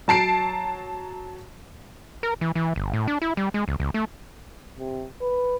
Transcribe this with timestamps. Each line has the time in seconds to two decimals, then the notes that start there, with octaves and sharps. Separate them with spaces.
0.08 F#3 A5 C7 D7
2.23 A#4
2.41 E3
2.55 E3
2.76 G1
2.93 A2
3.08 D4
3.22 E4
3.37 G3
3.54 G#3
3.68 C#2
3.80 C#2
3.94 A3
4.79 C3
5.21 B4